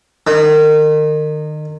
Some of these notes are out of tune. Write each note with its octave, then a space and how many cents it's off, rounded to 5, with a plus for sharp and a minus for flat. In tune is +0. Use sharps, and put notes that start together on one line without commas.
D#3 -30